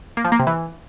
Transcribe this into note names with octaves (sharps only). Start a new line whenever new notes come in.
A#3
F3
A#3
C3
E3